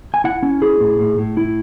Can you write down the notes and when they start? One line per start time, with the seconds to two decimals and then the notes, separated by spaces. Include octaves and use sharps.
0.14 G#5
0.24 E4 F#5
0.43 C#4
0.62 E4 G#4
0.80 A2
0.99 A2
1.18 A2
1.37 E4